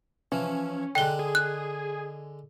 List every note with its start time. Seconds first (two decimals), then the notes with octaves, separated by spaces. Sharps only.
0.32 E3 F3 C#4
0.95 D3 G#3 G5 F#6 G7
1.19 G#4
1.35 F#6